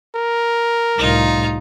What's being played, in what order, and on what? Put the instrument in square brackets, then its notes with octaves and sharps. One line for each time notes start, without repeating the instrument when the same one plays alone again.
[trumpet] A#4
[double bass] C2 A2 [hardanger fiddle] D#4 F4